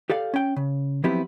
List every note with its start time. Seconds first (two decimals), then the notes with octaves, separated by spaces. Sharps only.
0.10 G4 A4 D5 F5
0.34 C#4 G5
0.56 C#3
1.04 F3 F#3 B3 C4 E4 G4